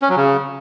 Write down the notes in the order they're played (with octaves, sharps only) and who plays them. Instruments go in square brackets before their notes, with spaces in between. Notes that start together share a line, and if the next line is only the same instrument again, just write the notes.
[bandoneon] C#4
F#3
C#3